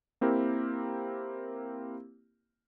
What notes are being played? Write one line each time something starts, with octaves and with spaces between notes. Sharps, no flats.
A#3 C4 E4 G4 A#4